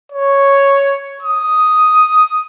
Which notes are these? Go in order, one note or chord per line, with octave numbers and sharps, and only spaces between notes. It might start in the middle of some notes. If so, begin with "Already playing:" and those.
C#5
D#6